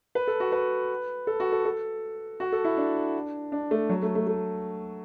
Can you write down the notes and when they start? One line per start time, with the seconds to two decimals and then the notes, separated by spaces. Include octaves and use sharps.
0.15 B4
0.27 A4
0.40 F#4
0.52 B4
1.27 A4
1.40 F#4
1.52 A4
1.65 A4
2.40 F#4
2.52 A4
2.65 E4
2.77 D4
3.52 D4
3.71 A3
3.89 F#3
4.03 A3
4.15 A3
4.27 A3